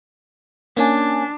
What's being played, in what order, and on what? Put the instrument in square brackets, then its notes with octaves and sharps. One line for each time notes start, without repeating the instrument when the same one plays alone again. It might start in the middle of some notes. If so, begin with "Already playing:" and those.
[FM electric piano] A#3 C#4 G#5 [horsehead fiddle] D4